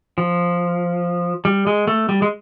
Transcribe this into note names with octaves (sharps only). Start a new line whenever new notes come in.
F3
G3
G#3
A3
G3
G#3